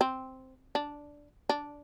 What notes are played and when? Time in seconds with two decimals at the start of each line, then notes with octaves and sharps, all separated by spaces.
0.01 C4
0.75 D4
1.49 D4